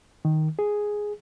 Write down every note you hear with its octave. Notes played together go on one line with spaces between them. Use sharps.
D#3
G#4